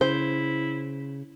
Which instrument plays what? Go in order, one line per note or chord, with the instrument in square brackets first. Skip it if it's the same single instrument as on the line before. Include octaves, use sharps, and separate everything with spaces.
[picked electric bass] C#3 [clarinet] E4 [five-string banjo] C5